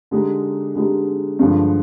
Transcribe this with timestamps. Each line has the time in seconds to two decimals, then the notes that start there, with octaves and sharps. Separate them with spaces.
0.11 D3 G#3 D#4 G4
0.75 D3 G#3 D#4 G4
1.39 G2 D3 F3 G#3